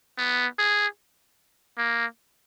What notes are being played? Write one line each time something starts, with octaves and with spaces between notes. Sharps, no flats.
B3
G#4
A#3